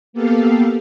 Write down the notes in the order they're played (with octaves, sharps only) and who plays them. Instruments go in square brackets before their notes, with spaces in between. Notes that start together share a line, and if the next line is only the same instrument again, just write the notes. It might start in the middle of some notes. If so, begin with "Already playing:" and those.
[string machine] A#3 B3 G4 A4 F5